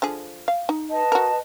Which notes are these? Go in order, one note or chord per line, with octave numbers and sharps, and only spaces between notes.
D3 F3 G#4
F5
D#4
B4 D#5 A5
F#4 A#4